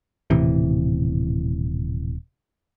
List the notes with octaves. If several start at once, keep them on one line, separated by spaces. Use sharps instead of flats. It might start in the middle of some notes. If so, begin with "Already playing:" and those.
D#1 A2 C3 E3